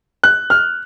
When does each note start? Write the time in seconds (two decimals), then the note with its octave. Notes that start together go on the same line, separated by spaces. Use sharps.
0.24 F#6
0.50 F6